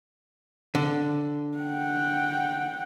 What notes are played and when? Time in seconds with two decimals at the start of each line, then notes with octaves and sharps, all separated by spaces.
0.75 D3
1.58 F#5 G5